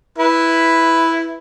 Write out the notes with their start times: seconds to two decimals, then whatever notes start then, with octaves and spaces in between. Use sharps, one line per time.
0.18 E4 B4